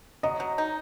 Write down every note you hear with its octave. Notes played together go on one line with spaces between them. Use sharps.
F#3 D#5
F#3
D#4